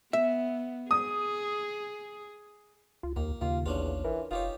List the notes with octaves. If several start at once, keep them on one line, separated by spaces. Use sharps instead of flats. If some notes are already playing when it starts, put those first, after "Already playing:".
B3 E5
G#4 D#6
C#2 F4
D#2 A#3
D#2 C#3 A#3 F4
A1 E2 C#4 D4 F4
E3 A#4
F1 D#4 F4 G4 C#5